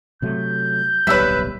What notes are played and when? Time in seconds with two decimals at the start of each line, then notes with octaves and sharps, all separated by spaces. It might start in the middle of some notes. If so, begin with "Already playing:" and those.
0.22 C3 F#3 A3 G6
1.07 D1 B1 G3 B4 C#5 E5 E6 B6